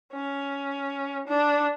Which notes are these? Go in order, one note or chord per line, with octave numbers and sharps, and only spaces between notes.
C#4
D4